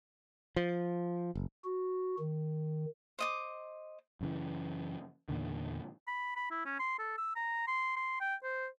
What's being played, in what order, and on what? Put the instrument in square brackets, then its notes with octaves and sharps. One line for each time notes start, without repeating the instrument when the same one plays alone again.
[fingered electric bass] F3
F#1
[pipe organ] F#4
D#3
[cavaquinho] C5 D#5 D6
[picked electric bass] F#2 C#3 E3
E2 A#2 D3 D#3
[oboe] B5
B5
E4
C#4
C6
A4
E6
A#5
C6
C6
G5
C5